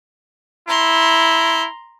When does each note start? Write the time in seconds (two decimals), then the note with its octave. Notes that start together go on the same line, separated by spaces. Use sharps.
0.68 E4 A#5 C6